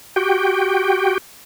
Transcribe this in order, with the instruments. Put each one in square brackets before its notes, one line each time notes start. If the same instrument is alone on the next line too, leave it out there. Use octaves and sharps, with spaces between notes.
[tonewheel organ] F#4 G4 G5